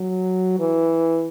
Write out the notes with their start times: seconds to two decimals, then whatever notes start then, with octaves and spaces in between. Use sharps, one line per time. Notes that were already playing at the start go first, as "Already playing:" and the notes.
Already playing: F#3
0.59 E3